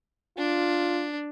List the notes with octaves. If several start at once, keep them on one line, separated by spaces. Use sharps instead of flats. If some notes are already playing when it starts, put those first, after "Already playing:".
D4 F4